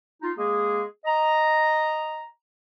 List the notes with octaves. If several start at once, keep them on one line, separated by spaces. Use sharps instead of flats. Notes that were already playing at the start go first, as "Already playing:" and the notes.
D#4 F4
G#3 A#3 G#4
D#5 A#5